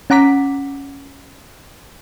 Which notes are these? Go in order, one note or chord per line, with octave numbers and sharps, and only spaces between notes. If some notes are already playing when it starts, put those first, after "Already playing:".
C#4 F#5 A#5 D6 B6